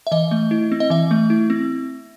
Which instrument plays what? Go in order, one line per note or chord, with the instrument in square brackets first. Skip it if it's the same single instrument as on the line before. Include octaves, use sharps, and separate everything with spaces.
[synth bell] E5
E3 D#5
A3
E4
C4
D#5
E3 E5
A3
E4
C4